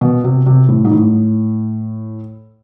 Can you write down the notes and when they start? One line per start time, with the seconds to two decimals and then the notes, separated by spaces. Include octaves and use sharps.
0.01 B2
0.24 C3
0.46 C3
0.69 A2
0.85 G#2
0.91 A2